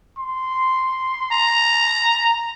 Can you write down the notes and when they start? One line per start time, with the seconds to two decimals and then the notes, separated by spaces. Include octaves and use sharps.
0.18 C6
1.31 A#5